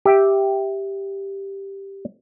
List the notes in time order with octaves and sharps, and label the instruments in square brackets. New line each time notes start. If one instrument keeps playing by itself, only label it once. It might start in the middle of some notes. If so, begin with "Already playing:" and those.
[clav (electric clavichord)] G4 E5 G5